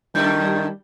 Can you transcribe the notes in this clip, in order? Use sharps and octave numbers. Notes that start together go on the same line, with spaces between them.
F#2 D#3 G3 A3 E4 G6